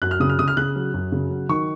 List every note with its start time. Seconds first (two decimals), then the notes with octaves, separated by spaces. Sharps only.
0.02 F#2 F#6
0.11 F6
0.20 C#3 D#6
0.29 F6
0.39 C#3 D#6
0.48 F6
0.57 C#3 F#6
0.76 F#3
0.94 F#2
1.12 C#3
1.30 F#3
1.49 D#3 C#6